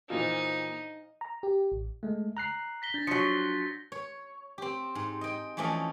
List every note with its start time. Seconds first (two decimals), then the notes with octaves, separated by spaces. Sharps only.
0.10 A#2 E3 F3 D4 D#4 F4 G#4
1.21 A#5
1.43 G4
1.72 A1
2.03 G#3 A3
2.37 A#5 F#6 C7
2.82 A#6 B6 G7
2.94 D4 G6 A6 A#6
3.07 F3 F#3 C#7
3.92 C#5
4.58 C4 G4
4.95 G#2
5.21 D#5 G5
5.57 E3 F3 A3 C#4 D5 D#5